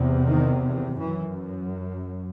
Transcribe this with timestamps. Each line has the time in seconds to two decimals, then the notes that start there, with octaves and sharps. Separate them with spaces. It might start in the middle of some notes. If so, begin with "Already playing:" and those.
Already playing: E2 C3
0.27 D#3
0.98 F#2 E3